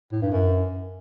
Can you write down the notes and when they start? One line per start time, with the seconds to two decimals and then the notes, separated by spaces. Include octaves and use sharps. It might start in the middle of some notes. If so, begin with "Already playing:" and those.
0.12 A2
0.22 G2
0.32 F#2